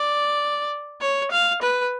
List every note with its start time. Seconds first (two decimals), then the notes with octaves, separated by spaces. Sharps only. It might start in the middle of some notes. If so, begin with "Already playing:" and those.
Already playing: D5
1.01 C#5
1.31 F5
1.62 B4